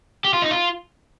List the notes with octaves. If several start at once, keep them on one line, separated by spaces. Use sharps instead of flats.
G4
F4
D#4
F4